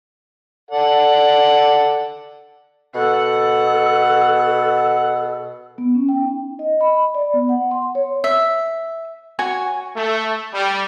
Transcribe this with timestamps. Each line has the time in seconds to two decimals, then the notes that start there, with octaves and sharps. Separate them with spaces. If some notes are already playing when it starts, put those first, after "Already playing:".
0.71 A4 D5 F#5
2.95 B2 A4 F#5
5.78 B3
5.95 C#4
6.09 G5
6.22 D#4
6.59 D#5
6.81 B5
7.15 D5
7.34 B3
7.49 F#5
7.71 C6
7.95 C#5
8.24 E5
9.39 F#4 C#5 G#5
9.95 A3
10.53 G3